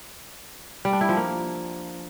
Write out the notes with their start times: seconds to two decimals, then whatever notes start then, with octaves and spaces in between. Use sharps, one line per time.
0.85 G3
0.93 D4
1.01 E4
1.09 F3
1.17 A#3